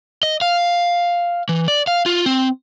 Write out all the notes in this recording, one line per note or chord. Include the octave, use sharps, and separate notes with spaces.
D#5
F5
E3
D5
F5
F4
C4